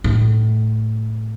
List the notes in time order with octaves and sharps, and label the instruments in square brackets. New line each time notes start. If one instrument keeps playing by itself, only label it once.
[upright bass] A2